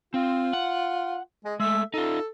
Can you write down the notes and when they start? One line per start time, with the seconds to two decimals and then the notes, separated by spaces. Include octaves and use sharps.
0.14 C4 F4
0.53 F#5
1.45 G#3
1.60 G#3 A3 E5
1.94 D#4 F4 A4